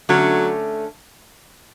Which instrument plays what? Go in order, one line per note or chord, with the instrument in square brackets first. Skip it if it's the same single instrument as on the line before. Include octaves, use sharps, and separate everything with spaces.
[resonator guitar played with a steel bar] D3 A3 C#4 [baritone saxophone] F#3